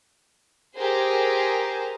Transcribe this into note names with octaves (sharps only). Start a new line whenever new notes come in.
G4 G#4 A#4 C5